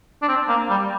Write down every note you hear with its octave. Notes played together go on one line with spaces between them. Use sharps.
D4
C4
A#3
G3